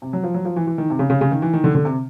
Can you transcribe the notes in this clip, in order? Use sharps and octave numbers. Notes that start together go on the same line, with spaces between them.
C3
F#3
F3
F#3
F3
E3
E3
D#3
C3
C#3
C#3
C#3
D#3
E3
D#3
D3
D3
C3